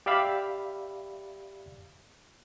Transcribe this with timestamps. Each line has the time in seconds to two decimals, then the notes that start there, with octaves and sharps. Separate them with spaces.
0.06 G4 D5 E5 F5 B5